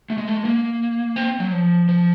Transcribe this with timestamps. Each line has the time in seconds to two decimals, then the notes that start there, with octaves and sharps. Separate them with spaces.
0.10 A3
0.18 G#3
0.28 A3
0.36 G#3
0.45 A#3
1.16 C4
1.40 F#3
1.52 F3
1.89 F3